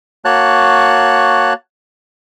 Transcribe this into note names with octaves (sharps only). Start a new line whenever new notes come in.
A#3 F#4 C#5 A5 F#6